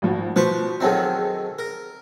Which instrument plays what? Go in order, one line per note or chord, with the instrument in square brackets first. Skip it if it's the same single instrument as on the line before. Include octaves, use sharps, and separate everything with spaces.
[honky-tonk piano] G#1 F3 F#4
[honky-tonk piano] B2 F3 [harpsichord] B4 C5 C#6
[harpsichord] D#3 F#3 C4 [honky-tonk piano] G#4 A4 C5
[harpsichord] A#4